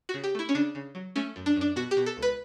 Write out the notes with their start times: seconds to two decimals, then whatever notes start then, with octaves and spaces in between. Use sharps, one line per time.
0.09 F#4
0.14 C#3
0.24 G4
0.35 A3 E4
0.49 C#4
0.55 C#3 D4
0.75 C#3
0.95 F#3
1.16 A3 C#4
1.36 F#2
1.46 D4
1.56 F#2 D4
1.76 B2 F#4
1.91 G4
1.97 B2
2.06 A4
2.17 C#2
2.22 B4